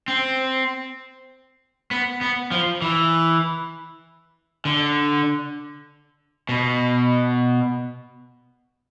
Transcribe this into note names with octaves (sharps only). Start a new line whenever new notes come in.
C4
B3
B3
F3
E3
D3
B2